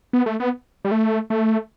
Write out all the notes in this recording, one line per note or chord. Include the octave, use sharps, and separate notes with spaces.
B3
A3
B3
G3
A3
A3